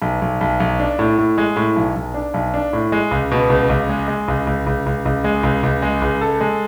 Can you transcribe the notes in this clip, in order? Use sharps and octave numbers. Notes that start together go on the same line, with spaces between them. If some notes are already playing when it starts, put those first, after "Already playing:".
B1
B1
B1
B1
D4
A2
A2
G#3
A2
B1
B1
D4
B1
D4
A2
G#3
C#2
B2
C#2
C#2
G#3
G#3
C#2
C#2
C#2
C#2
C#2
G#3
C#2
C#2
G#3
C#2
A4
G#3